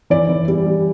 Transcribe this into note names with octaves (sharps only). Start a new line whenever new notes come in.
E3 D5
E3
G3
G3